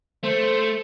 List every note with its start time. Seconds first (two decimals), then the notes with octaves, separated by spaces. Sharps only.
0.24 A3 C5